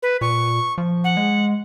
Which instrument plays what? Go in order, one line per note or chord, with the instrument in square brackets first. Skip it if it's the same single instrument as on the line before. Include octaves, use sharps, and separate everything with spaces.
[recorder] B4
[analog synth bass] A#2 [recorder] C#6
[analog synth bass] F3
[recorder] F#5
[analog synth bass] G#3